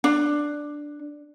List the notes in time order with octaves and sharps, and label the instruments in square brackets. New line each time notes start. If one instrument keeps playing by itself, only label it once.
[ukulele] D4